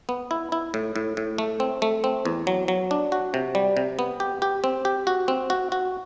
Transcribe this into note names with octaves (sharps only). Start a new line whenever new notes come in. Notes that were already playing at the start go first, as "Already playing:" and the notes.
B3
E4
E4
A2
A2
A2
A3
C4
A3
C4
E2
F#3
F#3
D4
F#4
C3
G3
C3
B3
G4
G4
C4
G4
F#4
C4
F#4
F#4